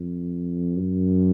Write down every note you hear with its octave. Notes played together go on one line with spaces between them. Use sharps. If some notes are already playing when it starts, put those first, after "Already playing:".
Already playing: F2
F#2